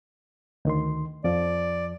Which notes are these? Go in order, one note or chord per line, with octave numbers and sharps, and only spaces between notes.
D2 D#3 C6
F2 F3 D5